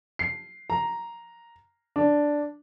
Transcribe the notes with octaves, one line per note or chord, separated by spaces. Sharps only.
C7
A#5
D4